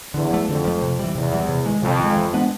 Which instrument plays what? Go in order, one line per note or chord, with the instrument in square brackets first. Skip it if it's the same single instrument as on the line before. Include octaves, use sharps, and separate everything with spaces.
[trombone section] E2 [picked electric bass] D3
[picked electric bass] F3 A3
[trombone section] F2 [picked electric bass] D3
[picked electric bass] F3 A3
C3
E3 G3
[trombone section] E2 [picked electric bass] C3
[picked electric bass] E3 G3
C3
D#3 G#3
[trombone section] F2 [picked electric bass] C3
[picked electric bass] D#3 G#3
E3
G#3 B3 D4